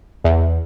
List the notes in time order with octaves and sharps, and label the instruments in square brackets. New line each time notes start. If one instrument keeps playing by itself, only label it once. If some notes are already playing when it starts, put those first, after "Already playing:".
[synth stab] E2